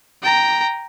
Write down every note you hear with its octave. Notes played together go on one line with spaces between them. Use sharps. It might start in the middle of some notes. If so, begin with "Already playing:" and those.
G5 A#5